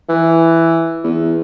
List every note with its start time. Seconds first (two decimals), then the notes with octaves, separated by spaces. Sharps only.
0.09 E3
1.04 E2